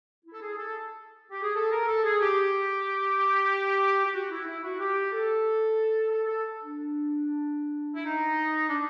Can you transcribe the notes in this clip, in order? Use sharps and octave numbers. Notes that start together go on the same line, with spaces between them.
E4
A4
G#4
A4
G4
G#4
A4
A#4
A4
G#4
G4
G4
F#4
E4
E4
F#4
G4
A4
A4
A4
D4
E4
D#4
D4